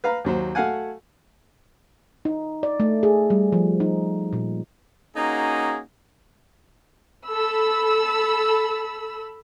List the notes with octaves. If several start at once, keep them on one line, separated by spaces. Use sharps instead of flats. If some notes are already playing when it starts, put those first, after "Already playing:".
B4 F5 A#5
D#2 F#3 C5
A3 F#4 F5 F#5 G#5
D#4
D5
A3
G#4
G3
F3
D#4
A#2
A#3 C#4 D#4 F#4 G#4
A4 B5 E6